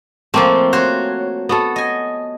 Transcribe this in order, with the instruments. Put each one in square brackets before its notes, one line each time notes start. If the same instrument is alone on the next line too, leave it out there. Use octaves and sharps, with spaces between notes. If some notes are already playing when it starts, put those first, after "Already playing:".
[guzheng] F3 C4 [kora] A3 A#3
[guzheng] F#4 C5 C#5
[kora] B3 F#4 A4
[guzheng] D#5 G#5